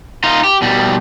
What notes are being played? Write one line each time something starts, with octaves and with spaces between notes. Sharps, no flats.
D#4 F4
G4
B2 G3